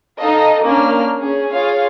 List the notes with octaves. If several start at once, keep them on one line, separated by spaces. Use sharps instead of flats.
D#4 A4 D#5 F5
A#3 C#4 D4 F6
C#4 G#4
F4 G#4 C#5 F5